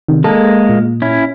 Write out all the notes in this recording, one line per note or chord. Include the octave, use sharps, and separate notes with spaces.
C3 D#3
G#3 A#3 A4
A#2
C#4 E4